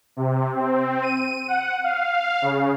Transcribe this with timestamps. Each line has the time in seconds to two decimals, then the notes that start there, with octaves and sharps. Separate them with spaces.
0.17 C3
0.55 C4
1.03 D#7
1.48 F#5
1.84 F5
2.42 C#3